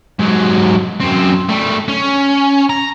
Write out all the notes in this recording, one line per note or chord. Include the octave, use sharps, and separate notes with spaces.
G#2 F#3
F#2 C4
G3 A3
C#4
A#5